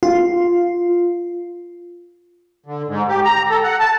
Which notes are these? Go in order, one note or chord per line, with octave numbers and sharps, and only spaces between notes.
F4
D3
G#2
G4
A#5
A4
F#5
A5